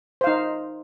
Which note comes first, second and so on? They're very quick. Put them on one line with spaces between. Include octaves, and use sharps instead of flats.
C5 F5 D#4